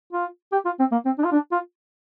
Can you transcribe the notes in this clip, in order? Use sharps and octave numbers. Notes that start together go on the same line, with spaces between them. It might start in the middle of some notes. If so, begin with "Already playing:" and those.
F4
G4
F4
C4
A#3
C4
D4
F4
D4
F4